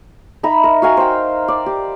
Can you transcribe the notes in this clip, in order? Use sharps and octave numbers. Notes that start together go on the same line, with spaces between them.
D#4 E5 A#5 B5
A#4
F#4 F5 G#5 A#5
C5 G5
D5
G4